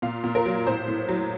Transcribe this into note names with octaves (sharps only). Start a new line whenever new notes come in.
A#2 F5
A#2
A#4
F#3
A2 C5
A2
F#3